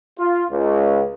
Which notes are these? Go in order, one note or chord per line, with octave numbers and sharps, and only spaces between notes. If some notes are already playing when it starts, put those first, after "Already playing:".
F4
C#2